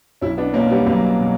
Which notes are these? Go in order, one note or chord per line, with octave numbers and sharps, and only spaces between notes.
B1 C#4 E4
B3 D4
B2 A#3 C#4
G3 B3
B1 F#3 A#3
B2